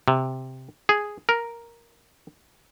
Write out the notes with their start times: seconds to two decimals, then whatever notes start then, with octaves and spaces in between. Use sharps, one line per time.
0.08 C3
0.89 G#4
1.29 A#4